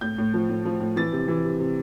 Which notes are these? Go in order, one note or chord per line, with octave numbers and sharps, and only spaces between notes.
A2 G6
A2
F3
A2
F3
A2
E3 A6
C3
E3
C3
C3